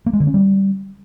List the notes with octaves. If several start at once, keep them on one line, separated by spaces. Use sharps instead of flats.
A#3
G#3
D3
C#4
G3